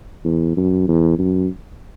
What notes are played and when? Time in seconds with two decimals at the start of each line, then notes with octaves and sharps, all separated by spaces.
0.24 E2
0.57 F#2
0.88 E2
1.19 F#2